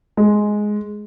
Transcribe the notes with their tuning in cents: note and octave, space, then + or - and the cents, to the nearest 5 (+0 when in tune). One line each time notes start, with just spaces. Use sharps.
G#3 +5